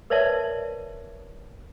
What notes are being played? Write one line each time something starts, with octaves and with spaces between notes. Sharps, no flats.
A#4 B4 C#5 D5 E5 A5